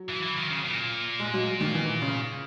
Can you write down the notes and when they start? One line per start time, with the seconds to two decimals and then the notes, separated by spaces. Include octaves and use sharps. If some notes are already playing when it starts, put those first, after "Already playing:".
Already playing: F#3
0.10 E3
0.23 E3
0.37 D#3
0.51 C#3
0.65 A#2
1.19 G#3
1.34 F#3
1.61 D#3
1.74 E3
2.02 C#3